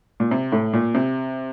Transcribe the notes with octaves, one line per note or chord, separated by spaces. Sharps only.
A#2
C3
A2
A#2
C3